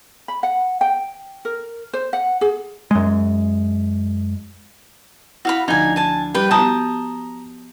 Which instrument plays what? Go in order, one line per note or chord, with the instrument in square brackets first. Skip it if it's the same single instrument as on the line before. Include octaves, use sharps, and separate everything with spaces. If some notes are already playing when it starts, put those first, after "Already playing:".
[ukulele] B5
F#5
G5
A#4
C5
F#5
G#4
[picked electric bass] F#2 G#3
[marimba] E4 [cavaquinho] F#4 F5 B5
[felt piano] D2 D4 G#6 [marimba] F3 [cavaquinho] D#4 G#5
[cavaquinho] G#5 A5
[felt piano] G3 [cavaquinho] B4 G5
[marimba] B3 F#4 G4 [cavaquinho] A5 D#6 [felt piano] A#5 G6